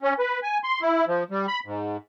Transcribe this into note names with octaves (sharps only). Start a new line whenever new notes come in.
C#4
B4
G#5
C6
E4
F3
G3
B5
G#2